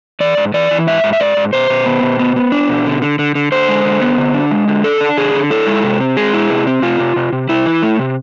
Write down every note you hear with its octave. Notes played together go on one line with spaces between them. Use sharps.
E3 D5
G#2
E3 D5
E3
G#2 E5
G#2
E5
G#2 D5
G#2
B2 C5
B2
B3
B2
B3
B3
D4
B2
D3
D3
D3
D3
D3 C5
G#3
D3
B3
D3
D4
G#3
D3
D4 A4
D4
D3 G#4
D3
E4 A4
G#3
C3
C4
G#3 G#4
E4
C3
C4
C3 F4
C3
C3
C3
C3 E4
E3
A3
C3